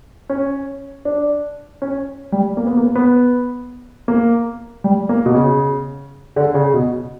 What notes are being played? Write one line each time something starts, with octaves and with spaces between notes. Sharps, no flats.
C#4
D4
C#4
G3
A#3
B3
A#3
B3
A#3
G3
A#3
B2
C#3
D3
C#3
B2